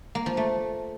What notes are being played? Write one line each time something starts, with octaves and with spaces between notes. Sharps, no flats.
A#3
F3
A3